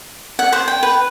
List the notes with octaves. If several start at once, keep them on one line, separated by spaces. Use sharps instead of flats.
F#5
C5
G5
B4